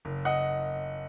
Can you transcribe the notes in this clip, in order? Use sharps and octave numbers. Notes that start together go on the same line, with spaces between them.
F#1
D#5 F#5